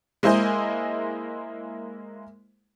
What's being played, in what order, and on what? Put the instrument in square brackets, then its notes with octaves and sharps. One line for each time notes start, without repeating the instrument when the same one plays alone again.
[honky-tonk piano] G#3 A#3 E4 C5 D#5 G#5